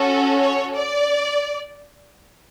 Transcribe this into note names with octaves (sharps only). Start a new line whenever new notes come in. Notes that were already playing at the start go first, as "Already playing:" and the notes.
Already playing: C#4 F#4 A4
C#5
D5